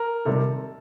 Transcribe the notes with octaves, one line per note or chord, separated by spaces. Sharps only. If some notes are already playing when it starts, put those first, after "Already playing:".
Already playing: A#4
C3 D#3 G3 A4